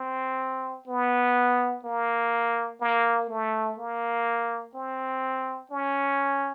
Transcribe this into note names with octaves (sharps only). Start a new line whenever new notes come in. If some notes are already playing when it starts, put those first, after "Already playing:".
Already playing: C4
B3
A#3
A#3
A3
A#3
C4
C#4